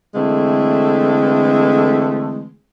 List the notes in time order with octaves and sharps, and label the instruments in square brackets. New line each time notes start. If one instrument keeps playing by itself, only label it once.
[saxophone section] D3 E3 G#3 A3 C4